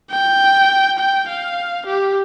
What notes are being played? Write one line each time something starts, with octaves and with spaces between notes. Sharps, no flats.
G5
G5
F5
G4